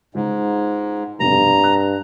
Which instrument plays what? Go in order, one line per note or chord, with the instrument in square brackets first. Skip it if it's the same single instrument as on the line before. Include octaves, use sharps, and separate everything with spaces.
[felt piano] C#2 [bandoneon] G#2
[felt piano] F1 B2 C4 [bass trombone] G2 [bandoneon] A#5
[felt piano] F#6